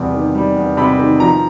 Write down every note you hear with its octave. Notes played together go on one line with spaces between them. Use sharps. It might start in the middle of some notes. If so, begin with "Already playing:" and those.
Already playing: E2 C3 G3
D#3
G3
E2
C3 B5
D#3
F3 A#5